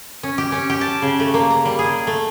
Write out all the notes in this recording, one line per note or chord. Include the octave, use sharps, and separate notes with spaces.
C#4
G4
C#4
G4
A5
C#3
A3
A#3
A#5
G3
G#4
A3